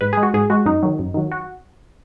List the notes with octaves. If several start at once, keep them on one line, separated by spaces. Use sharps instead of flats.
G#2 B4
G#3 G#4
F#4
G#2 G#4
G#3 F#4
F#2 D#4
D#3 F#3
F#2
D#3 F#3
F#4